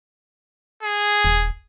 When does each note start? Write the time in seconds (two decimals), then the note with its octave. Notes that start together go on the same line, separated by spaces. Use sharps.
0.83 G#4
1.25 D#1